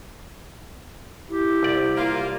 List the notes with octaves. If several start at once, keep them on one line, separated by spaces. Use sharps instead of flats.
E4 G4
C2 D5
A#3 F4